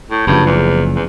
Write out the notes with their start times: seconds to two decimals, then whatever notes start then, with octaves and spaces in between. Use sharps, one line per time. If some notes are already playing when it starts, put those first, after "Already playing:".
0.11 A2
0.27 F#1 G2 C#3 F3
0.46 E2
0.95 E2